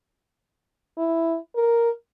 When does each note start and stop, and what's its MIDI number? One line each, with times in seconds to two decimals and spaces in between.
0.98 1.38 64
1.56 1.90 70